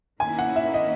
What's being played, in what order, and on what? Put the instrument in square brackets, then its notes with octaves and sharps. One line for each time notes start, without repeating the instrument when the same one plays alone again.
[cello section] D#3 A#3 C#4 E4 [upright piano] G#5
[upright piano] F#5
E5
D#5